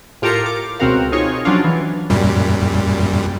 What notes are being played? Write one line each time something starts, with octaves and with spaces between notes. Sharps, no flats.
A2 F4 G4 A4 A#4 C#7
D6
C#2 B2 C4 F#4 A#4 F5
D#4 F4 G#4 C#5
F3 F#3 C#4 D4 F4
E3
F#2 A#2 G3